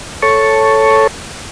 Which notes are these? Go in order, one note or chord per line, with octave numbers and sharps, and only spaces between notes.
A4 C#5 A5 C#6